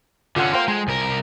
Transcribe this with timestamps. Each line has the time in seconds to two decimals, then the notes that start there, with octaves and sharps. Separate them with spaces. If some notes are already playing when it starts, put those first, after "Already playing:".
0.36 D3 C#4 F4 A4 F#5
0.53 A#4 C5 F5 G5 C6
0.68 G#3 G#5 A#5
0.88 C2 A#4